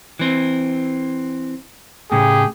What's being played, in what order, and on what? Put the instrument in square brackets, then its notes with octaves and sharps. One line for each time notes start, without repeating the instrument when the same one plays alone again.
[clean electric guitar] E3 C4
[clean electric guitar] A2 C#3 [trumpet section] G4 G#4